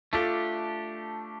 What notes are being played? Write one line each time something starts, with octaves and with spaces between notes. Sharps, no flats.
A3 D4 F4 G4 A4